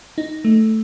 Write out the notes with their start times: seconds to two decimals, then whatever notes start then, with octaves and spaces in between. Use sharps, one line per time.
0.18 D#4
0.44 A3